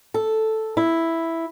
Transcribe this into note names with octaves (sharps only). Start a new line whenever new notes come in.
A4
E4